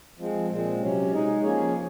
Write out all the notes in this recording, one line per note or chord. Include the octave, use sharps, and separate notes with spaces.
F3 G#3 C4
A#2 G#3 C4
C3 F#3 C#4
G#3 D#4 G#4
F3 A#3 C#4 G#4 C#5